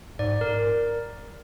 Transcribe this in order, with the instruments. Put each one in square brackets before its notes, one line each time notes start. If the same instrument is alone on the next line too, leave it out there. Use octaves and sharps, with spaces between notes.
[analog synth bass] G#2 [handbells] D5
[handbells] A#4